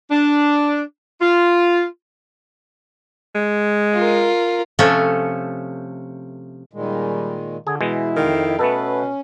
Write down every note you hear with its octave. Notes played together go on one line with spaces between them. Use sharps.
D4
F4
G#3
F4 A#4
C3 F3 A3 C#4 A4
A#2 D#3 G3 G#3
D3 G#4
B2 E3 G#3 E4 G#4
F2 D#3 F5 G5
B2 A3 B3 C#4 A4 B4